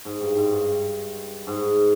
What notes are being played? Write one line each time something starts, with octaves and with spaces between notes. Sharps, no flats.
G#2
G2
G#2
G2
G#2